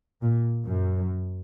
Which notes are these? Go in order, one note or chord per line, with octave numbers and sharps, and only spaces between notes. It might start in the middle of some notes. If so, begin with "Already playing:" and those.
A#2
F#2